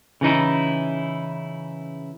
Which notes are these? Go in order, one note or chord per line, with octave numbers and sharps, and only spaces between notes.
C#3 E3 D#4 E4